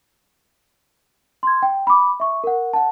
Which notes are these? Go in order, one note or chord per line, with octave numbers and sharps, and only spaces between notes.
C6 G#6
G5
B5 D6
E5 C#6
A#4 F#5
F#5 A5